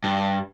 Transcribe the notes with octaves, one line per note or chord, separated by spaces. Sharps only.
G2